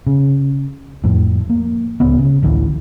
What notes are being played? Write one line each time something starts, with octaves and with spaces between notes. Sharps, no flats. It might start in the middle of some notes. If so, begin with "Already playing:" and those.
C#3
F2 A2
A#3
D1 C#2 B3
C#3
A1 D2 D3 E3